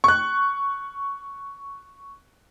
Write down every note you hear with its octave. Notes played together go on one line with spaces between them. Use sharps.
C#6 F#6